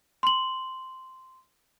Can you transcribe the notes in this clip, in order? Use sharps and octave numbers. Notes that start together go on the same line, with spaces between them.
C6 F#7